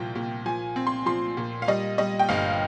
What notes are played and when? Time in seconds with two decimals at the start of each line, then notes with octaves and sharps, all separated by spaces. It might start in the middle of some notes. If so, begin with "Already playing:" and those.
Already playing: C2 A#2 F3 G5
0.15 A#2
0.46 F3 G#5
0.76 C4
0.87 C6
1.06 F3 C6
1.37 A#2
1.62 F5
1.68 G3 D#5
1.98 G3 D#5
2.19 G5
2.29 G1 F5